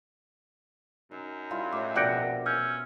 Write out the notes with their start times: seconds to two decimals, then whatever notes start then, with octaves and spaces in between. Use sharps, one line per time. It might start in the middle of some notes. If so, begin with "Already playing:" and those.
1.11 F#2 D#4
1.51 G3 E4 F4
1.72 A2 D#5 D6
1.96 A#1 B2 D5 F#5 G5 D6 A#6
2.46 C#4 E5 E6 F6 G6